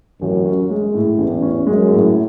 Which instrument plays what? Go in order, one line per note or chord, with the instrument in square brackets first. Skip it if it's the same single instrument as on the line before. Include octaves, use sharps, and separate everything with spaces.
[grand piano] A1 [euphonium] F#2
[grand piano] C#4
G#3
A2
[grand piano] A1 [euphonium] E2
[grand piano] C#4
[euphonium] F#2 [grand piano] G#3
[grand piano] A2